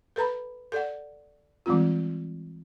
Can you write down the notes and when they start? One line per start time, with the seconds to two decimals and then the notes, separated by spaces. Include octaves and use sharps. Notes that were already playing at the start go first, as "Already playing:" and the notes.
0.16 A4 B4 A#5 B5
0.72 A4 D5 F#5
1.66 E3 G3 G#3 C4 F4